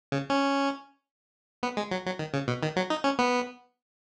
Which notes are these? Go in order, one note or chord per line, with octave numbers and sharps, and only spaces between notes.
C#3
C#4
B3
G#3
F#3
F#3
D#3
C#3
B2
D#3
F#3
D#4
C#4
B3